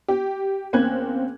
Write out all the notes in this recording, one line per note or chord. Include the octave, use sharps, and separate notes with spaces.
G4
E2 A#3 C4 C#4 F#6 G#6